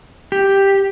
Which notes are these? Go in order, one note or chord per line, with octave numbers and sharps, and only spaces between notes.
G4